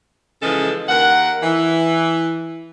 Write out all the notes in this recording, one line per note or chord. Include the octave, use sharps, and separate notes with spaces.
C#3 E3 F3 G#3 A4
D#2 A#4 F#5
E3